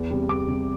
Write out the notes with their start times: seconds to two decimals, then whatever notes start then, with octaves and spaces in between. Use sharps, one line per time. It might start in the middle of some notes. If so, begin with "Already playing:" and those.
Already playing: E2
0.10 C3 G3
0.29 E2 D6
0.48 C3 G3